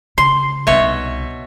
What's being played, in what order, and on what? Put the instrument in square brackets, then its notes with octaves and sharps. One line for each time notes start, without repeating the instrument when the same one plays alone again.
[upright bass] C#3 [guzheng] C6
[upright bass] C2 D#4 [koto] B2 C#5 [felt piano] E5